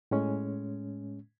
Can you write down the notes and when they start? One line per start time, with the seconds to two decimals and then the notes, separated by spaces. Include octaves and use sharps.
0.11 A2 G#3 C#4